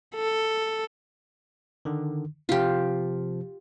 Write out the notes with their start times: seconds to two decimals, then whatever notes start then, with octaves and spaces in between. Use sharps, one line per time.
0.16 A4
1.85 D3 D#3
2.49 C3 F3 F4 G4